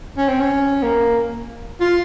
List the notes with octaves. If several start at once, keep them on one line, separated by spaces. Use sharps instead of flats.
C#4
C4
C#4
A#3
F4